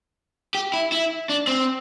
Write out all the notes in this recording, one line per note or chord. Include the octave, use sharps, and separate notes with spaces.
G4
E4
E4
D4
C4